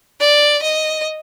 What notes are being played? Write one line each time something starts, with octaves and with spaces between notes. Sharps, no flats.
D5
D#5